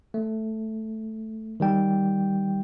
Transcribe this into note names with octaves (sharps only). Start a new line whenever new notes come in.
A3
D#3 G3 G5